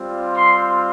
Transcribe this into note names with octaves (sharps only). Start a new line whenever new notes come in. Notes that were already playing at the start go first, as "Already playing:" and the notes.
Already playing: G3 C4 F4
C6